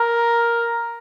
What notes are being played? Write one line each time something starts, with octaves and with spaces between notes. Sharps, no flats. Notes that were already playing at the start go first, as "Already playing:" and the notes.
Already playing: A#4